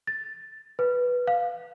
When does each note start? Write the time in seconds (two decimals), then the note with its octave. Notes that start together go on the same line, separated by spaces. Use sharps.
0.07 A6
0.79 B4
1.28 F5